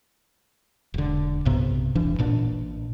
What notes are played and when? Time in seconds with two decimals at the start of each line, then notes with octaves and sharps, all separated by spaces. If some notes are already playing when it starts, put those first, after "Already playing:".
0.94 E1 D3
1.45 B1 G2 C3 B3
1.95 E1 E3 D4
2.19 A1 A#2 D4